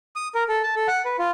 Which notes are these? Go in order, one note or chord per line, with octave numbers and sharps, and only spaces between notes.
D#6
A#4
A4
A5
A4
F#5
B4
F4